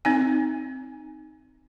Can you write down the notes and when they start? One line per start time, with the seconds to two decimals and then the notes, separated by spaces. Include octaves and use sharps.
0.05 C4 D#4 G#5